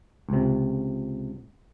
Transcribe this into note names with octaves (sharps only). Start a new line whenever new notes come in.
C#2 C3